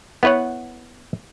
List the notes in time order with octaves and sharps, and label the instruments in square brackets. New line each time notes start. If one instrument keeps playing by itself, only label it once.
[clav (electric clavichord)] B3 E4 B4 C#5 F#5